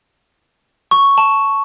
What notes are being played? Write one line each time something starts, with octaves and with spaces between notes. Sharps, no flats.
C#6
A5